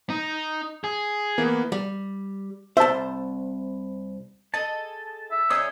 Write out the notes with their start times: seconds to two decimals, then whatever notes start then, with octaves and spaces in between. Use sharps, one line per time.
0.10 D#4
0.84 G#4
1.38 E3 A#3 B3
1.72 G3
2.77 C2 C5 E5 A5
4.54 G#4 A4 D#5 A5
5.31 E5
5.50 G3 C#4 D#4 G#4 C#5 D#6